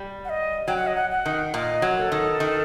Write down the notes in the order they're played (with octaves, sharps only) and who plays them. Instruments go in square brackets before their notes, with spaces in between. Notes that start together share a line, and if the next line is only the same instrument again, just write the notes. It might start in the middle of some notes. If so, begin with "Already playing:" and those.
Already playing: [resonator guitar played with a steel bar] G3
[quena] F#5
D#5
[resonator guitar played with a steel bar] F#3 [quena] G5
[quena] F#5
D#5
F#5
F#5
[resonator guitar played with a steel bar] D#3
[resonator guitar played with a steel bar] A#2 [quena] D#5
[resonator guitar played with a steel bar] F#3
[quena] A#4
A4
[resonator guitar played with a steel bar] D#3
D#3